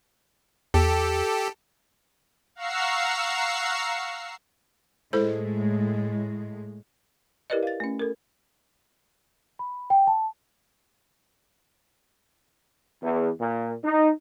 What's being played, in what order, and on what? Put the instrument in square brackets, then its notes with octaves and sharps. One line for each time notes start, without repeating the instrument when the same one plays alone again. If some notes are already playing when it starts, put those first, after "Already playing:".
[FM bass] E2 [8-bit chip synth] G4 A4
[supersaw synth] F5 F#5 A#5 C#6 E6 C7
[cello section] A2 G#3 [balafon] E4 A4 C5
[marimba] E4 G4 A#4 B4 D5 D#5
F5 A6
A3 C#4
A4 A#4
[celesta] B5
G5
A5
[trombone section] E2
A#2
D#4